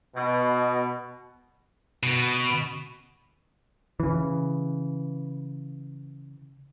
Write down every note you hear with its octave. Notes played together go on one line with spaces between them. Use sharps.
B2
B2
C#3 E3